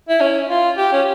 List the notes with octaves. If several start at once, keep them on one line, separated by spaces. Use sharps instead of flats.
E4
C#4
F4
G4
C#4